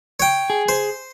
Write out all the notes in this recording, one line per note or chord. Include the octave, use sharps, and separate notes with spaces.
C#5 G5
G#4
C5